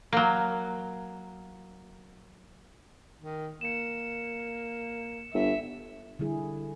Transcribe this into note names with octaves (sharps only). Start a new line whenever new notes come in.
F#3 A#3
D#3
A#3 C#7 E7
G1 E5
D3 G3 E4 G#4